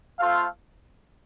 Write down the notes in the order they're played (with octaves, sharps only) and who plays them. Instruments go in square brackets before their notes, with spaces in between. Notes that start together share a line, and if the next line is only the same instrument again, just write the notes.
[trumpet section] A3 F4 A4 C5 F5